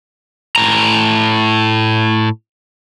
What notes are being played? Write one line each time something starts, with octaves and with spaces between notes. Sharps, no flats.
A2 A#5